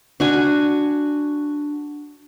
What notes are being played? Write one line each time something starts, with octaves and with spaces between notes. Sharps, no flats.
D4 F#4 G#5